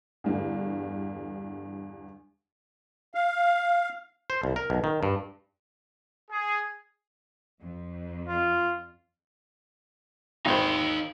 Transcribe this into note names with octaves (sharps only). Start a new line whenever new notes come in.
E2 G2 D3
F5
C5
C2
A#4
B1
D#3
G2
G#4
F2
F4
G#1 D#4 C5 F5